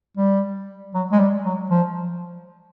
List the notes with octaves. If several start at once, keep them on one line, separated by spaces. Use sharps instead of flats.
G3
F#3
G#3
G3
F#3
F3